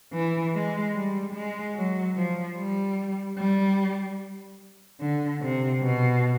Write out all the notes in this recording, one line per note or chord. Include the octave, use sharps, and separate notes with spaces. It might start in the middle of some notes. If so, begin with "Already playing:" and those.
E3
G#3
G3
G#3
F#3
F3
G3
G3
D3
C3
B2